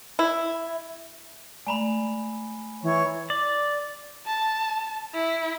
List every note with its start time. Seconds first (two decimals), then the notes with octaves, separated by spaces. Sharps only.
0.19 E4
1.67 G#3 A3 D5 G#5 A#5 B5
2.83 E3 C#5
3.30 D5
4.26 A5
5.14 E4